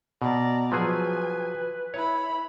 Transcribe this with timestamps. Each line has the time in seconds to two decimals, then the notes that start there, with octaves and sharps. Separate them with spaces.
0.22 B2 D5 A#5
0.72 F3 F#3 G#4 B4 G#5
1.94 E4 C#5 B5